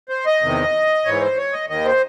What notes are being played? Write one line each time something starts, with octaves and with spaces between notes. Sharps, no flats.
C5
D#5
E2 C3 D#3
G#2 E3 C#5
C5
C#5
D#5
D#2 D#3 D#5
C5